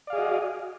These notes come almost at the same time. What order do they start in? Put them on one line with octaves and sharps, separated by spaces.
D5 F5 G#4 D#5 F#4